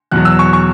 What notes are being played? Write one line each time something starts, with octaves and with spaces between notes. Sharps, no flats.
E2 B2 F#3 F#6
E6
C#6
C#6